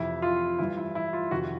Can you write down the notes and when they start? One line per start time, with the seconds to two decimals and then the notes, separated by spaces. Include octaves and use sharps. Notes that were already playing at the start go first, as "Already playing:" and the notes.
Already playing: F2 C3 E3 E4
0.22 F4
0.59 G2 E3 E4
0.77 E4
0.95 E4
1.13 F4
1.31 F2 C3 D#3 F#4